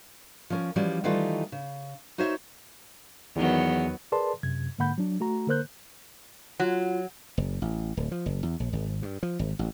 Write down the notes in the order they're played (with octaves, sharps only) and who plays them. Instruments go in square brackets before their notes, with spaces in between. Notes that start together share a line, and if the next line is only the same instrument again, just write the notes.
[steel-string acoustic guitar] F3 C#4 A#4
E3 F3 G3 C#4 F#4
D#3 E3 G3 A3 D#4 F4
C#3
D#4 F#4 C5 C#5 E5
[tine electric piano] E2 [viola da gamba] D#3 F#3 B3
[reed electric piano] G#4 A#4 B4 D5 A5 C6
F#2 C3 G#6
G#2 D3 A#3 F#5 B5 G6
F#3 D4
A3 F#4 A#5
D3 A#3 A#4 C5 F#6 G6
[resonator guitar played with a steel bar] F#3 [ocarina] F4
[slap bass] F#1
A1
D1
F3
F#1
E2
A#1
G#1
G2
F3
G#1
A1